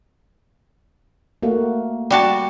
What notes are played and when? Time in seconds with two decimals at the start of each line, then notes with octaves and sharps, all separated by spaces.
1.43 A3 A#3 F#4
2.10 G3 F#4 A5